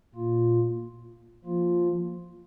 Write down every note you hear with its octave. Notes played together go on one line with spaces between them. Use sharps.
A#2 A#3 F4
F3 A#3 F4